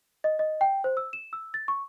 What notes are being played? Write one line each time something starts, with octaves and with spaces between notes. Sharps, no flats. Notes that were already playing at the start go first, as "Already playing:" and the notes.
D#5
D#5
G5
C5
E6
E7
E6
A6
C#6